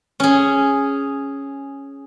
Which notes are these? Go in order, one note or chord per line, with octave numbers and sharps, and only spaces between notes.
C#4 G#4